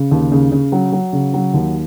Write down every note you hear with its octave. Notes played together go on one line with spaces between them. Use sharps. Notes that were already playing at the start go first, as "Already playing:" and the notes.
Already playing: C#3
D#2
C#3
C#3
F#3
F#3
C#3
F#3
D#2